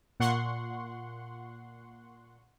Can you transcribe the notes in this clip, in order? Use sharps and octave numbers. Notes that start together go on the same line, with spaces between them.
A#2 F#5 C6 C#6